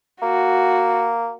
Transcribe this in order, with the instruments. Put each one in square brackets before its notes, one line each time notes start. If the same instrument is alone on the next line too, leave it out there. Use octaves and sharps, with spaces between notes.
[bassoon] A#3 [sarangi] F#4